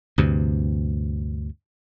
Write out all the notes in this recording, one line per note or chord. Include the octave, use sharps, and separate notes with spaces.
D2 G2 C3